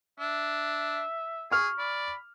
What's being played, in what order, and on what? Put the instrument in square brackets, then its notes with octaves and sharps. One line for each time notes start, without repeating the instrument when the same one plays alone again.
[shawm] D4 [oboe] E5
[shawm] G#4 [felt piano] C#6 F6
[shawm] D5 [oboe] B5